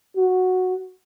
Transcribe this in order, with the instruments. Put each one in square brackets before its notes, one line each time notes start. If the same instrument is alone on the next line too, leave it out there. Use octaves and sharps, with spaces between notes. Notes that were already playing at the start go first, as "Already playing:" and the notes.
[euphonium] F#4